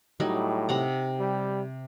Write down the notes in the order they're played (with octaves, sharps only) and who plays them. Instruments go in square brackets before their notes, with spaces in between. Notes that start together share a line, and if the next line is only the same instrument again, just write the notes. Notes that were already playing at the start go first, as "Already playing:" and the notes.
[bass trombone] A2 [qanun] F#3 G3 D#4
[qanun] C3 F#5 A#5
[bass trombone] G3